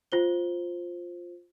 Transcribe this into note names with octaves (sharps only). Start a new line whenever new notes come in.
F4 C5 G7